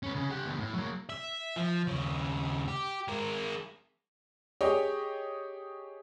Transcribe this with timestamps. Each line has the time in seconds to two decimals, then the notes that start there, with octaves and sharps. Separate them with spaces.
0.03 C#4 B4
0.15 C#3 C#4
0.30 G4 F#5
0.46 D2 B3
0.60 A2
0.75 F#3 A#3
1.09 E5
1.56 F3
1.87 D#2 C#3
2.68 G4
3.08 G#3 A#4
4.61 G4 G#4 C#5 D#5